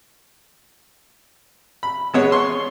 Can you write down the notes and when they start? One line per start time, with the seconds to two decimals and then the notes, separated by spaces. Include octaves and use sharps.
1.83 B5
2.14 G#3 B3 C#5
2.32 C6 C#6